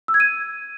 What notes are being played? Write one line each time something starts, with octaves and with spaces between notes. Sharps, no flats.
E6
G#6
D#7